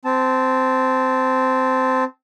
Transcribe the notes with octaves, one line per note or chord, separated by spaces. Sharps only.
C4 A5